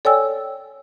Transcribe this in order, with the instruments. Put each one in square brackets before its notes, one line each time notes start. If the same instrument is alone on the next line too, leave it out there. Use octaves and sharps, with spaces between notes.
[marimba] A4 C#5 D5 G5 G#5 E6